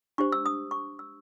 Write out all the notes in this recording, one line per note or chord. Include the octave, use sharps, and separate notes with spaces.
D4 G4 C5 C#6
E6
D#6
C#6
E6